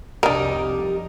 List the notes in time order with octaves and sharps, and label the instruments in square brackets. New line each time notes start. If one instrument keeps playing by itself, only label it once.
[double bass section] C2 F2 C3 [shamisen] D4 A#4 [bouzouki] D#4 G4